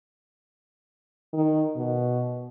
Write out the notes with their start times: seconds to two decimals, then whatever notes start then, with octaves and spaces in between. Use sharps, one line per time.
1.33 D#3
1.76 B2